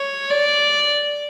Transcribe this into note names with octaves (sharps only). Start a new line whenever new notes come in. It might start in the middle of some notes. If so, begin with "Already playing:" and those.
Already playing: C#5
D5